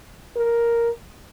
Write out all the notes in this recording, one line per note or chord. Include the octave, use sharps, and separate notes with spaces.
A#4